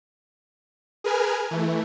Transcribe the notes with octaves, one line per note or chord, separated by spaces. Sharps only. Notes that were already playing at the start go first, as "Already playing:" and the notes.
G#4 A#4 B4 G#5 F6
E3 A3